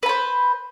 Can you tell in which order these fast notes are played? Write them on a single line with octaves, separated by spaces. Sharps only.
B4 B5 C5